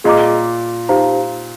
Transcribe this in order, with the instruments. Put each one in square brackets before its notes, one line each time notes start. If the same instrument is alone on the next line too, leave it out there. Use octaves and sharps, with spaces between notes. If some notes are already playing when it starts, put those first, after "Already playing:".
[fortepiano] A#2 [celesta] G#4 D#5 A#5 D6
[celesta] D#4 G4 C5 F5 A#5